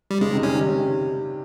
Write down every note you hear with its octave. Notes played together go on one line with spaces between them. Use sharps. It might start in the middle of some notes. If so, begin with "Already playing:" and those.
G3
C#3 G#3
C3 D#3
D#3 G3 C#4
D#3 G3